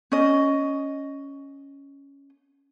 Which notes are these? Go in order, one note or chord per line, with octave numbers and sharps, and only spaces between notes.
C#4 D#5